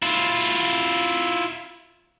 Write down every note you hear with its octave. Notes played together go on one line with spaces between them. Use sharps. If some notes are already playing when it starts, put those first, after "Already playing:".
E4 F4